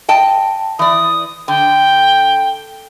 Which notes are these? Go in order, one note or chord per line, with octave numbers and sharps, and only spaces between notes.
D#5 G5 A5
E3 D5 D#6
D3 G5